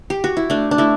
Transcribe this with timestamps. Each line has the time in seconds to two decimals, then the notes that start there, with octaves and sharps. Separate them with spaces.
0.10 G4
0.24 F#4
0.37 E4
0.50 A3 D4
0.71 D4
0.78 A3 E4